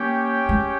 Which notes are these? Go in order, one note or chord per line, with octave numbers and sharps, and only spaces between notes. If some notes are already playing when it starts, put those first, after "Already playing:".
Already playing: A#3 C#4 G4 C#5 G5
G#3